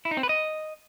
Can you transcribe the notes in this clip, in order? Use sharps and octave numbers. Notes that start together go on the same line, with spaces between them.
E4
D#4
C4
B4
D#5